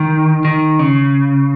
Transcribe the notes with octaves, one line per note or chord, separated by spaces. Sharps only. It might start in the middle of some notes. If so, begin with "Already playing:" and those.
Already playing: D#3
D#3
C#3